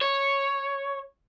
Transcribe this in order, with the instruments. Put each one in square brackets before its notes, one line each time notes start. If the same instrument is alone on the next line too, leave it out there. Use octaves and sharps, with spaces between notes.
[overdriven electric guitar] C#5